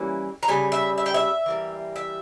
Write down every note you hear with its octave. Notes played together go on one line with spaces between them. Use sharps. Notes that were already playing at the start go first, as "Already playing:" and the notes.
Already playing: E3 G3 A#3 C#4
A#5
C#3 G3 G#5
E5
E5
G5
E5
E3 G3 A#3
E5